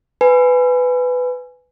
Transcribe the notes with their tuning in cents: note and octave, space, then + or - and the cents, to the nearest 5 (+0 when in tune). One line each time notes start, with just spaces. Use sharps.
B4 +15 G#5 +0